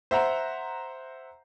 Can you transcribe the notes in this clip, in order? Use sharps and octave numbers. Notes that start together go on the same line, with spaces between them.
C5 E5 F#5 A#5